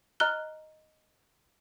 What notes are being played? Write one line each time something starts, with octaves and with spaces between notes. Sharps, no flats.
D#5 A#5 F6 F#6 G7